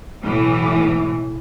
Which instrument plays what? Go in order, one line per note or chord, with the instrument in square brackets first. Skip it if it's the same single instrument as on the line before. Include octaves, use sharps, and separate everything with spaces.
[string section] B1 A2 E3